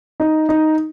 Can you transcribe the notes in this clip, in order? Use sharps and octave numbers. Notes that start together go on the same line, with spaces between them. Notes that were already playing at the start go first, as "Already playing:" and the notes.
D#4
D#4